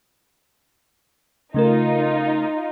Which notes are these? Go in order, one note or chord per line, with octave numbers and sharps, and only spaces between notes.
C#3 A3 D#4 F4 A#4